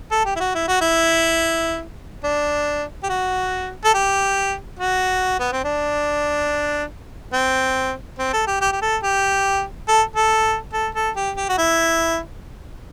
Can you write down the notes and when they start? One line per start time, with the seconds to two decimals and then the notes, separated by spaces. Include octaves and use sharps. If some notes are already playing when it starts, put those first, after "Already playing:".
0.11 A4
0.25 G4
0.36 E4
0.40 F#4
0.55 E4
0.68 F#4
0.81 E4
2.24 D4
3.03 G4
3.09 F#4
3.84 A4
3.94 G4
4.79 F#4
5.40 B3
5.52 C4
5.64 D4
7.33 C4
8.19 C4
8.33 A4
8.47 G4
8.61 G4
8.72 G4
8.82 A4
9.03 G4
9.88 A4
10.16 A4
10.73 A4
10.95 A4
11.16 G4
11.36 G4
11.49 F#4
11.58 E4